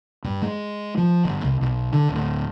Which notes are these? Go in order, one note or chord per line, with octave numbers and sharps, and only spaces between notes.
G2
G#3
F3
G1
C2
B1
D3
D1